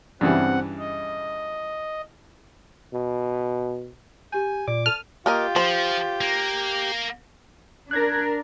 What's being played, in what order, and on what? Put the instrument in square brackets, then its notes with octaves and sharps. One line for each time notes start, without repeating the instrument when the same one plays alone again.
[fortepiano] G2 C#3 E3 [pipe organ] C4 F#5
[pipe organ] D#5
[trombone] B2
[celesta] G4 G6 [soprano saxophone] G#5
[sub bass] A#2 [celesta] D5 [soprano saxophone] D6
[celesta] A4 D#7 [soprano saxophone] A5 [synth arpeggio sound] F6
[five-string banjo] A#3 A#4 D#5 [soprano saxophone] F4 [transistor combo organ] G4
[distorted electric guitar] F3 [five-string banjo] C5
[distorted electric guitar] A#3
[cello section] D4 A#4 [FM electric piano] F#6 G#6 A#6